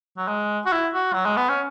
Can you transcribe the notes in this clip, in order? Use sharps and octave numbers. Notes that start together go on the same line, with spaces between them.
F#3
G#3
F#4
E4
F#4
F#3
G#3
B3
C#4